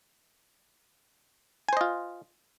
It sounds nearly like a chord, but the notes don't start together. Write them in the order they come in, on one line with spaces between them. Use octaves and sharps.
G#5 C5 D#5 F4